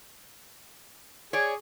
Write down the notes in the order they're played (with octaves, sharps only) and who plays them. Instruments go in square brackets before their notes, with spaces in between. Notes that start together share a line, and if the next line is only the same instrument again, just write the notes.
[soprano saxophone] G#4 [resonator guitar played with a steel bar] C#5 D5